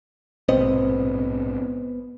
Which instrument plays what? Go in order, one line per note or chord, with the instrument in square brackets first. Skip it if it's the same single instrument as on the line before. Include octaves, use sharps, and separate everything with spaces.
[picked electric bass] A#1 G#2 B2 [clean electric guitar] B3 C5 D#5 [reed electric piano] C4